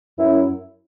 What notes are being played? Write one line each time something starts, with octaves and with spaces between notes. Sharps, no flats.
F#2 E4